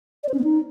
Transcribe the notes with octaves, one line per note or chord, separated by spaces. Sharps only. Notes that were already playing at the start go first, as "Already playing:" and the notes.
D5
C5
C#4
B3
D#4